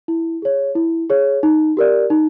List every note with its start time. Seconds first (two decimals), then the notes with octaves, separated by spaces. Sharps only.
0.08 E4
0.42 G#4 C#5
0.75 E4
1.10 G#4 C#5
1.43 D#4
1.77 G4 A#4 D5
2.10 D#4